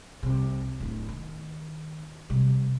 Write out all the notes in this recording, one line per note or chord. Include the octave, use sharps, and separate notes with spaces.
C2 C3
D1 E4
D#3
C3 G3